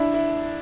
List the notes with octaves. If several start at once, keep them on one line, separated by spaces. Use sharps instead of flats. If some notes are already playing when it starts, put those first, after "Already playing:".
Already playing: D4 E4
E4